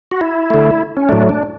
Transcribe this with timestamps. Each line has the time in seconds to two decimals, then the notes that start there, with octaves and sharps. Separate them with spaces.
0.11 F#4
0.21 E4
0.50 D3 A3
0.97 C#4
1.09 A2 F#3 A3 D4
1.29 D4